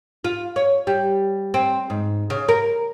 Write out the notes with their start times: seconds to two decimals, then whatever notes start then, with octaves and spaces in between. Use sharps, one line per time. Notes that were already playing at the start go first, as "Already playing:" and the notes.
0.24 F4
0.56 C#5
0.87 G3
1.54 C4
1.90 G#2
2.30 C#3
2.48 A#4